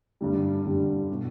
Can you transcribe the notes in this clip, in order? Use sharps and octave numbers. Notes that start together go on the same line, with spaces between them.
G2 D3 G3
G2 D3 G3
B2